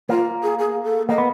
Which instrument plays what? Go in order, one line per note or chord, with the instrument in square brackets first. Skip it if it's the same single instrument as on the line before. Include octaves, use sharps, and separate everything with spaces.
[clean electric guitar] A#3 [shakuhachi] F4
[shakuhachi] G#4
G#4
A4
[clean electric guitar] A#3 [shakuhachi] D#5
[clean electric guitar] B3